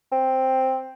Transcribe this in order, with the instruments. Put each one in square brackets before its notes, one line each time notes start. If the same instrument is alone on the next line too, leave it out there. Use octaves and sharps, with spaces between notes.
[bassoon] C4